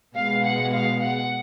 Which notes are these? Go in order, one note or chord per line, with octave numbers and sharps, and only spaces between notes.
B2 G#3 B3 F5
F#5
F5
F#5